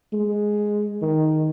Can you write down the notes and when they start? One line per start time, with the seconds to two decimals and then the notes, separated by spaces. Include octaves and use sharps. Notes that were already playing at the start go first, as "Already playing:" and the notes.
0.13 G#3
1.02 D#3